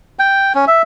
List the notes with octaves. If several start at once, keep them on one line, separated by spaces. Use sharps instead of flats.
G5
C#4
E5